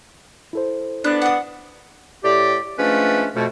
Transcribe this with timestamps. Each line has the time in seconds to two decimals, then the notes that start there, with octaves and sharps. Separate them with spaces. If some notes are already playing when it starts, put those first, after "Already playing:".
0.53 E4 A4 C5
1.04 B3 D4 F#6
1.22 F#5 D#6
2.24 A2 G4 D5
2.78 F3 G#3 A3 C#4 D4 B4
3.35 F2 B2 A3